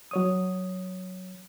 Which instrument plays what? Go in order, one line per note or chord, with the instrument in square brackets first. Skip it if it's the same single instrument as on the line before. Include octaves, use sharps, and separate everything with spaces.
[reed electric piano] F#3 C#5 D#6